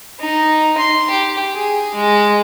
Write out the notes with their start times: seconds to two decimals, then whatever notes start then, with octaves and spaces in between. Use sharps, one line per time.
0.20 D#4
0.78 C6
1.10 G4
1.52 G#4
1.94 G#3